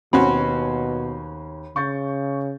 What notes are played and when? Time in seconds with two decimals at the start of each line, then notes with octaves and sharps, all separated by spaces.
0.13 D#2 B2 C4 C#4 F#4 B5
1.76 C#3 C#6 G6 A6